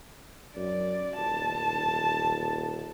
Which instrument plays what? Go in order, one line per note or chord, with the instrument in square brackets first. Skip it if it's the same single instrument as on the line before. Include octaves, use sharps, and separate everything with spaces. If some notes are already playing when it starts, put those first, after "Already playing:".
[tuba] F#2 [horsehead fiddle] D5
[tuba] D#1 [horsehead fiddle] A5